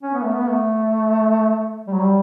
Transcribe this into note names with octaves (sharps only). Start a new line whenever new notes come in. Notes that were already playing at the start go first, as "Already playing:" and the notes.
C#4
B3
A3
B3
A3
G3
F#3
G3